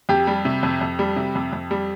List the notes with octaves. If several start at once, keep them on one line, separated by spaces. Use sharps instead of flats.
F2 G4
G3
C3
F2
F2
G3
C3
F2
F2
G3